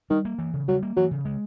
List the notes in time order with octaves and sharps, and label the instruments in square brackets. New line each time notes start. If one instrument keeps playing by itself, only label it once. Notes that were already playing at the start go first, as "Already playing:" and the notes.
[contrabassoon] D#3 [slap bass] G3
[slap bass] A#3
E3
C#3
[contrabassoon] F#3 [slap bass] G3
[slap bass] A#3
[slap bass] E3 [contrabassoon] F#3
[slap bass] C#3
G#3